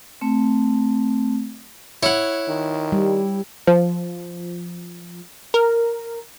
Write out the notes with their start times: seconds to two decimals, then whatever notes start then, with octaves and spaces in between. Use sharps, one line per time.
0.21 A3 C4
2.03 E4 C#5 F#5
2.48 D#3
2.92 G3
3.67 F3
5.54 A#4